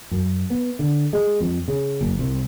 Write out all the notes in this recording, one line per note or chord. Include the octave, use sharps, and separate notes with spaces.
F#2
B3
D3
G#3
F2
C#3
F#1
C2